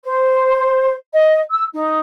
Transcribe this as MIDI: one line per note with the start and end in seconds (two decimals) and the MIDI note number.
0.04 0.93 72
1.14 1.39 75
1.50 1.65 88
1.74 2.01 63